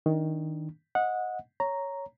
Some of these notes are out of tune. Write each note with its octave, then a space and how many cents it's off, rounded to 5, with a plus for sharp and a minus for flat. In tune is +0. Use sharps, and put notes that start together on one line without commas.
D#3 +15 D4 +5
D#5 +10 F#5 -20
C#5 +0 A#5 +0